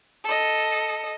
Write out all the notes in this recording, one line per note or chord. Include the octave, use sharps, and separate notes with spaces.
A4 D#5